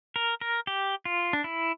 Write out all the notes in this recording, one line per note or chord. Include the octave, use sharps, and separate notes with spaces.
A#4
A#4
G4
F4
D4
E4